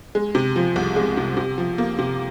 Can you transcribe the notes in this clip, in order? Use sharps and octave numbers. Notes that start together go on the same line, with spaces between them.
G#3
C3
F3
C2
G#3
C3
C3
F3
A#3
C3